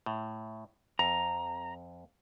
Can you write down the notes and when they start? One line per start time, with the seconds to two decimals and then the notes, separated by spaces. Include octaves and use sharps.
0.06 A2
0.99 F2 A#5